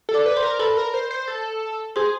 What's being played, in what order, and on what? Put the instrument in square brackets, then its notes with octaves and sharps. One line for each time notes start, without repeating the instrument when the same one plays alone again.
[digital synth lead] A4
[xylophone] D5 D6
[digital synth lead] B4
[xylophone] C5 C6
[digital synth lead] A#4
[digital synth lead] A4 [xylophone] B4 B5
[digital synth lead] A#4
C5
C5
A4
[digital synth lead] G#4 [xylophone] C5 C6